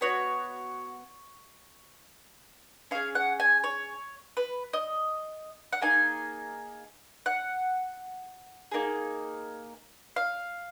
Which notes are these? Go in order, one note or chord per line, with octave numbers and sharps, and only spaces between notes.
B3 F#4 C#5
C#4 G#4 F5
F#5
G#5
C#5
B4
D#5
F#5
A#3 D#4 G#4 G#5
F#5
A#3 D#4 G#4
F5